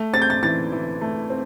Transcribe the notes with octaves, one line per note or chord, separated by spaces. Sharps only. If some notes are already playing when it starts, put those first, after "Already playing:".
Already playing: A3
C4 A6
G6
A6
E3 A6
E3
A3
C4